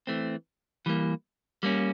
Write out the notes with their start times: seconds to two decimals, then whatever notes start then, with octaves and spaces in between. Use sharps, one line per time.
0.07 E3 A3 C4
0.86 E3 G3 A#3
1.63 G3 A#3 C#4